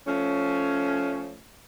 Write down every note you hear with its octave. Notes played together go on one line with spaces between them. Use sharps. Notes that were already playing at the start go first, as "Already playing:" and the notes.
F3 A3 C#4